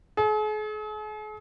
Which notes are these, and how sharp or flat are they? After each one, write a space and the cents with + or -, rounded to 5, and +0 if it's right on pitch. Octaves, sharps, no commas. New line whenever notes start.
G#4 +45